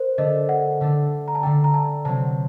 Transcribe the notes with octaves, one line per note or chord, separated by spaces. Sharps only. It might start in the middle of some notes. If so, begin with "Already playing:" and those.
Already playing: A#4 C5
D3 A3 D4 D#5
F#5
D3 A3 D4
A#5
A5
D3 A3 D4 G5
A#5
A5
C3 F#3 C4 A5